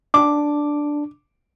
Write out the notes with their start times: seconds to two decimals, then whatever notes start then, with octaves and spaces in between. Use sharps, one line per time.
0.14 D4 D6